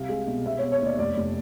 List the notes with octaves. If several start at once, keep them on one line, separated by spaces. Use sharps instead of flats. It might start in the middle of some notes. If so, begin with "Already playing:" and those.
Already playing: C2 F5
G#3
B2
B3 E5
B3 C#5
C#5
D#2 D5
F1 D5
F1